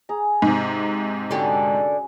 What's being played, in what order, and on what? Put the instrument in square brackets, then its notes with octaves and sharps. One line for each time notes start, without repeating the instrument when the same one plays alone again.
[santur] G#4 A#5
[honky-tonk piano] G#2 C3 [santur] A#5
[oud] D3 D4 G4 [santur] C#4 F#4